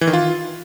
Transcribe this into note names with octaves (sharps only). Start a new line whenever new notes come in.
E3
D#3
F4